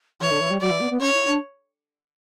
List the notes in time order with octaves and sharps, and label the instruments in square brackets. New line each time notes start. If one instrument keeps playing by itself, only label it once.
[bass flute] E3 [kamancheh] C#5
[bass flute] D3
E3
G3
[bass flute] F#3 [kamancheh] D5
[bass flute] E3
B3
B3
[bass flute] C#4 [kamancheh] C#5
[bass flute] E4
D4